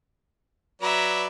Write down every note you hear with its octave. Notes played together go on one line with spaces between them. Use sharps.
F#3 B4 D5 E5 A#5